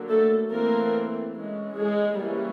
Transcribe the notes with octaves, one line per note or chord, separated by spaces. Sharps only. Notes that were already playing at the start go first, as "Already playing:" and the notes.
Already playing: D3 F#3 A#3
A3 A4
E3 A3 A#3 C4 A#4
E3 G#3 C#4
G#3 G#4
E3 G3 A#3 C#4